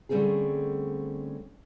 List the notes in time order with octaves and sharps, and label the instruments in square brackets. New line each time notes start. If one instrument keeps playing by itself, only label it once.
[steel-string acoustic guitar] D3 G3 A3 C4 C#4 G#4